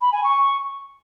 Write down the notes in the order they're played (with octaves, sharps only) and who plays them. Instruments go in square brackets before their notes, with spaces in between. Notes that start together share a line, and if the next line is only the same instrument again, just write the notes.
[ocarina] B5
G#5
C#6